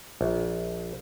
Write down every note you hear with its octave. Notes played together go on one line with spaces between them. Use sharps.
A#1